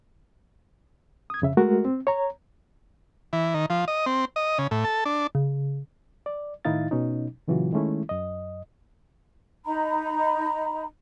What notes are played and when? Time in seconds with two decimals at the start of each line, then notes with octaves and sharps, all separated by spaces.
1.30 D#6 G#6
1.42 F2 C#3 E5
1.57 G#3 A3 F#4 A#4
1.85 C4
2.07 C#5 A#5
3.33 E3
3.54 D#3
3.70 F3
3.88 D#5
4.06 C4
4.36 D#5
4.58 C#3
4.71 A2
4.85 A4
5.05 D4
5.35 C#3
6.26 D5
6.65 A2 D#3 D#4 E4 F5 A6
6.91 B2 C#4 D#4
7.48 A#2 C#3 E3 F#3 F4 F#4
7.73 D#3 G#3 A3 C#4 E4
8.09 F#2 D#5
9.65 D#4 A#5 B5